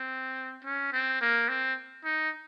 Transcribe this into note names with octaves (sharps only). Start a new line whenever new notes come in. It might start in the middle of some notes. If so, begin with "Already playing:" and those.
Already playing: C4
C#4
C4
A#3
C4
D#4